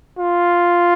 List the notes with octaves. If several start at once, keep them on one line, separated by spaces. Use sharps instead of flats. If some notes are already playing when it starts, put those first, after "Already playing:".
F4